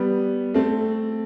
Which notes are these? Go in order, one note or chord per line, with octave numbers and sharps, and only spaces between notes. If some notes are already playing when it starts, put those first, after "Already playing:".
Already playing: G3 B3
A3 C4